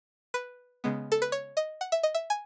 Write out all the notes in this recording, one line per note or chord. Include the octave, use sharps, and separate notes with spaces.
B4
C#3 G#3 B3
A4
B4
C#5
D#5
F#5
E5
D#5
E5
G#5